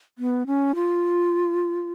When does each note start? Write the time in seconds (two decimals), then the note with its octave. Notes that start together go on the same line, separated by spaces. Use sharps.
0.18 B3
0.47 C#4
0.75 F4